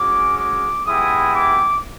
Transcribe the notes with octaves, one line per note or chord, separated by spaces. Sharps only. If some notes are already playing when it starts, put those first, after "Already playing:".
Already playing: G#3 C#4 F#4 D6
D6
G#3 B3 E4 G4 D#6
D6